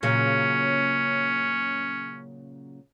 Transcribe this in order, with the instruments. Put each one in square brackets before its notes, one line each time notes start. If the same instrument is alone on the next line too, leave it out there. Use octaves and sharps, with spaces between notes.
[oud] A#2 C#3 F#3 [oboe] C#4